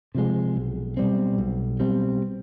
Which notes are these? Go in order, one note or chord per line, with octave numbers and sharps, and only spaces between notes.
C3 F3 G#3
B1
B2 G3 C4
B1
B2 G3 C4